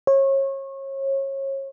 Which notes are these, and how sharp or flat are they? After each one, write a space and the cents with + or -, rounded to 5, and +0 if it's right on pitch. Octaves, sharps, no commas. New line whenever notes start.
C#5 -30